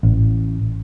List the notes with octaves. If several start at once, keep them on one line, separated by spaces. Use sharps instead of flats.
A1